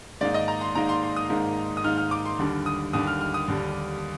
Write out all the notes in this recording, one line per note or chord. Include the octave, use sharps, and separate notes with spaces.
G#2 D#3 A#3 D#4 D5
D#5
A#5
C6
G#2 D#3 A#3 D#4 A#5
C6
C6
D#6
G#2 D#3 A#3 D#4
D#6
G#2 D#3 A#3 D#4 F6
F6
D6
C6
D#2 D3 G3 D4
D#6
D#2 D3 G3 D4 D#6
F6
F6
D#6
D#2 D3 G3 D4